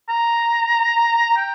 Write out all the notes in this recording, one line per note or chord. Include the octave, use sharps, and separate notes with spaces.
A#5
G5